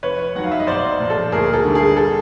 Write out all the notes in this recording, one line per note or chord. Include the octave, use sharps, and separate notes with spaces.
F1 B4 C#5
D#2 D#3 F#3 F#5
F5
E5
D#5
B1 C5 D5
A#2 F3
A4
D2 G#4 A#4
A4
D3 G3
G#4
A4